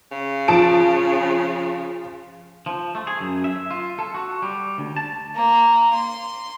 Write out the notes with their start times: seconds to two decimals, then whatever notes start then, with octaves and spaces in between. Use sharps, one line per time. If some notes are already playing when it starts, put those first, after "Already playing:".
0.12 C#3
0.48 F3 A5 D7
2.66 F3
2.95 A3
3.07 G#4
3.20 F#2
3.44 E5
3.71 F4
3.99 A4
4.15 F#4
4.42 G3
4.78 D2
4.96 A5
5.36 A#3
5.93 C6